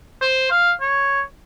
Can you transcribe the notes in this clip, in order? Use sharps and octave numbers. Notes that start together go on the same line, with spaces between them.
C5
F5
C#5